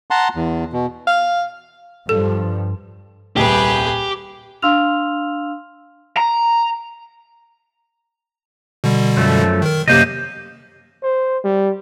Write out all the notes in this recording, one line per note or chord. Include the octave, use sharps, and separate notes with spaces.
F#5 A5 A#5 C6
E2
B2
F5
G2 F3 A4
D#1 C2 G4 G#4 B4
D4 F5 C6 E6 F6 F7
A#5
B2 D3 G3
F#2 F3 A3
D#3 A#4
F#2 C3 A#3 G4 C5 D#5
C5
G3